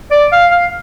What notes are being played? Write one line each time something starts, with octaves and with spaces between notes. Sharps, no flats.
D5
F5
F5